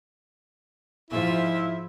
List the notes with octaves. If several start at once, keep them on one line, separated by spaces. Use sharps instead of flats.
G#2 F3 E4 F4 E5